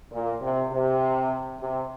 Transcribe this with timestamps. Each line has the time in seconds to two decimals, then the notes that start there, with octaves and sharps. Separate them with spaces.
0.12 A#2
0.42 C3
0.71 C3
1.60 C3